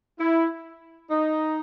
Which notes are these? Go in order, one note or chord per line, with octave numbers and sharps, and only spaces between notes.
E4
D#4